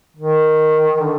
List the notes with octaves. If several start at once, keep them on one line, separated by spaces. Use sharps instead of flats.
D#3
D3